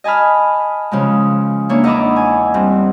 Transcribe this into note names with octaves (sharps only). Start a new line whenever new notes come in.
D#5 G#5 A5 B5 F6
C#3 F3 G#3
A#3 D4 E4 C#5
E2 D#4 D#5 B5 D6 E6
G#5
G2 C4